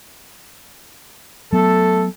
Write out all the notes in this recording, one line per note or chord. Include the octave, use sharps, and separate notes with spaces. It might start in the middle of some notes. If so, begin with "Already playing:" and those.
F#3 A3 B3 A4